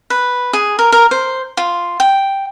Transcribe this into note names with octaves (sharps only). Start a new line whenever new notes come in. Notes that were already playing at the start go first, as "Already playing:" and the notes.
B4
G#4
A#4
A#4
C5
F4
G5